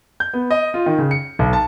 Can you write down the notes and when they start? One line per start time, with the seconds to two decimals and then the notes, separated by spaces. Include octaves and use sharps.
0.20 G6
0.33 B3
0.50 D#5
0.74 F4
0.86 D#3
0.98 C#3
1.11 C#7
1.39 B1
1.53 A5